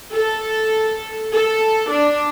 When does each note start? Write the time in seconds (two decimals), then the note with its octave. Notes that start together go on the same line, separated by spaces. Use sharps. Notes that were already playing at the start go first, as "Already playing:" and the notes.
0.13 A4
1.32 A4
1.89 D4